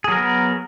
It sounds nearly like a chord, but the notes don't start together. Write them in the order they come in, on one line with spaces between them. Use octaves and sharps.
G#4 F#3 A#4 B3